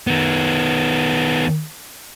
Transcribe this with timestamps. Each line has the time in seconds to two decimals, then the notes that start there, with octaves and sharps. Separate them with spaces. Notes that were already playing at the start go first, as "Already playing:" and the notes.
0.07 D#3 B3